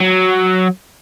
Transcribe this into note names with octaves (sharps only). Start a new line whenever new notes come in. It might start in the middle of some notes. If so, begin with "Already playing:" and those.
F#3